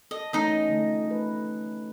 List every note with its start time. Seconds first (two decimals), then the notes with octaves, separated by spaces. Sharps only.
0.11 A4 D#5
0.33 E3 A3 C#4 D#4 D#5
0.69 D3 F3 A3
1.07 A3 B4